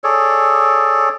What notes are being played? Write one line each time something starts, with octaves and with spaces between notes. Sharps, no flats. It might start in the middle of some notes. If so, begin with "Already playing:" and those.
G#4 A4 C#5 D5